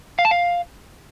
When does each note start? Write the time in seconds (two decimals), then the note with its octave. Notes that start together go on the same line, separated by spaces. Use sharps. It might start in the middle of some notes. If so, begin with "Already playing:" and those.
0.19 F5
0.25 A5
0.31 F5